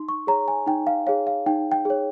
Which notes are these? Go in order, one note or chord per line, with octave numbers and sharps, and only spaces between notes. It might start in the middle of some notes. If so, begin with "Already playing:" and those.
Already playing: D#4 C6
C#6
G#4 C#5 A#5
G#5
D#4 G5
F5
G#4 C#5 F5
F5
D#4 G5
G5
G#4 C#5